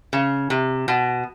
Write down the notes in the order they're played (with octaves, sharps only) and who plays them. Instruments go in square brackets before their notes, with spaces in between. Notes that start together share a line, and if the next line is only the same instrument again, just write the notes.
[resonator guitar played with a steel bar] C#3
C3
B2